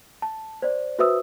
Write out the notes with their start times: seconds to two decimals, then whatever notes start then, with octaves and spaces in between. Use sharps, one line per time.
0.22 A5
0.62 C5 D5
0.99 F#4 B4 C5 E5 D#6 E6